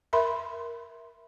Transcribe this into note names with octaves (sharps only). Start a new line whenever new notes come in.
A#4 E5 B5 C6